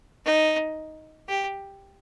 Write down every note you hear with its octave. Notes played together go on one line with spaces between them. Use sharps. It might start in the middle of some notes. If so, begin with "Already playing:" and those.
D#4
G4